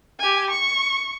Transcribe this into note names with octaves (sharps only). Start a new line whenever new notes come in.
G4 G#5
C#6